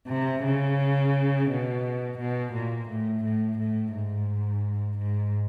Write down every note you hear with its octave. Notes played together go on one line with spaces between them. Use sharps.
C3
C#3
B2
B2
A#2
A2
A2
A2
G#2
G#2